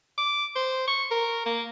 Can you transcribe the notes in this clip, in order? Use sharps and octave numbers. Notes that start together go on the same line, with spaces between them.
D6
C5
C#6
A#4
A#3